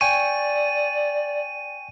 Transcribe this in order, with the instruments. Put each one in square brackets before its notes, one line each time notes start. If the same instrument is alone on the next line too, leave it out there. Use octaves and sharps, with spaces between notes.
[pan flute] D5 [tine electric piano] G5 G#5 C#6 [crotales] D#7